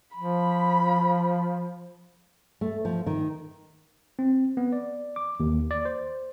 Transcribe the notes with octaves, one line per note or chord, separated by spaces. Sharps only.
F3 B5
A3
F3
D#3
C4
B3
D5
D6
D#2
D5
C5